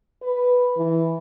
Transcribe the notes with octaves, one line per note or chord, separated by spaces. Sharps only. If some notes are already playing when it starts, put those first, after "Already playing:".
B4
E3